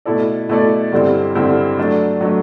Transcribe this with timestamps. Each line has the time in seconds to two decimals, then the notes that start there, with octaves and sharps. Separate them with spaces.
0.06 B2 A3 E4 A4 D5
0.49 B2 A3 E4 A4 D5
0.92 G2 D3 G3 C4 E4
1.35 G2 D3 G3 C4 E4
1.78 F#3 A3 D4
2.21 F#3 A3 D4